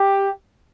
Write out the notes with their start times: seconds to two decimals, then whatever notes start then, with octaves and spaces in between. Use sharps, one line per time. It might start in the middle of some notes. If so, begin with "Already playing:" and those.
Already playing: G4